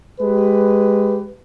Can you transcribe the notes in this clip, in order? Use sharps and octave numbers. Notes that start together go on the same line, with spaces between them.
G#3 G4 B4